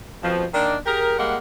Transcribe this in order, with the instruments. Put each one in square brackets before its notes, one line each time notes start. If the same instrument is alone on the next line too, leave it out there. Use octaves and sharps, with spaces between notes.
[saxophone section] F2 B2 F3
D#3 A#3 D4 D#4 D5
G4 G#4 A#4
G3 G#3 A#3 F#5